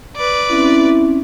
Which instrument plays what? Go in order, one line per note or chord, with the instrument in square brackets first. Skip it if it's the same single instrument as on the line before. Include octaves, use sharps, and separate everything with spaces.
[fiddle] B4 D5
[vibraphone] C4 C#4 [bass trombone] E4